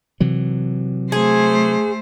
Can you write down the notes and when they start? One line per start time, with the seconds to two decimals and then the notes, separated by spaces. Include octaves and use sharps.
0.20 C3 E3 F#3
1.12 A3 G#4 C5